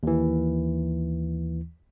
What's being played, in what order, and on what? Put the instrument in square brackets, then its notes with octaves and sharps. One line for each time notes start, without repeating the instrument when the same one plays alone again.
[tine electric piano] D#2 E3